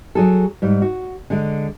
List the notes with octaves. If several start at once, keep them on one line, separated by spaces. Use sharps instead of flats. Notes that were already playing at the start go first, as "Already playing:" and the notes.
F#3 G#4 A4
G#2 G3
F#4
D3 G#3